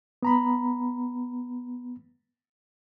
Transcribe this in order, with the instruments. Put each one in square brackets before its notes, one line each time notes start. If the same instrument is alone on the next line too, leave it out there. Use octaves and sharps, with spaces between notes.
[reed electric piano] B3 A#5 B5